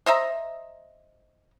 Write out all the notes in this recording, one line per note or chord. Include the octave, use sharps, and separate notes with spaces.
C5 D#5 E5 A#5